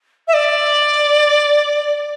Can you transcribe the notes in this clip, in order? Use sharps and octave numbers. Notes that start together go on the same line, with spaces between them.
E5
D5